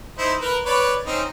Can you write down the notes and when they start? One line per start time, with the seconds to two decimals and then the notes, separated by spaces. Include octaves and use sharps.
0.18 D#4 E4 C5
0.41 A#4 B4
0.66 B4 C#5 D5
1.06 C4 C#4 D#4